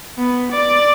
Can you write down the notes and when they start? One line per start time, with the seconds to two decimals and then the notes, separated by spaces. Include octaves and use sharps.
0.18 B3
0.52 D5